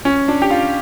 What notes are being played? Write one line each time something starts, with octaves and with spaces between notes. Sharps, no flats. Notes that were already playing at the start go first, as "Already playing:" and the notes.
C#4
D4
G4
F4